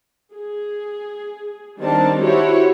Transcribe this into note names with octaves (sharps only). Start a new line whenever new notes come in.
G#4
D#3 G3 C4 D4 A#4 A5
E4 F#4 G4 C5 C#5